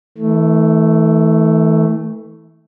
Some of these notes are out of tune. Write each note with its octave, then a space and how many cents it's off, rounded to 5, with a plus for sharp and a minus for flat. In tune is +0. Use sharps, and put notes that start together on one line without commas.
E3 -35 A3 +5